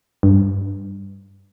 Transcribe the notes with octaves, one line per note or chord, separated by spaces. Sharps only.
G2